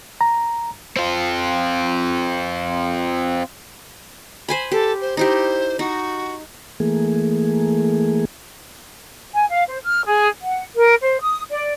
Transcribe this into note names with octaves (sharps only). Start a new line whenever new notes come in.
A#5
C4 F4
C5 G#5 B5
G4 A4
C5
D#4 E4 G4 C5
D#4 F#4
E3 A3 A#3 G#4
G#5
F5
C5
F6
G#4
F#5
A#4
C5
D#6
D5